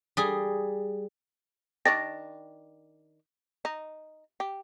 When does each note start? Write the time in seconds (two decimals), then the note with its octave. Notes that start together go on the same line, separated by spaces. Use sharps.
0.17 G3 G#4
1.86 D#3 D4 G4 A6 A#6
3.65 D#4
4.40 G4